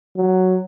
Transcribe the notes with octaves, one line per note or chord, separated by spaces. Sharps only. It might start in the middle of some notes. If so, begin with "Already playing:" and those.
F#3